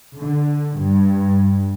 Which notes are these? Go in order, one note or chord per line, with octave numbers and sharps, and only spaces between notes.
D3
G2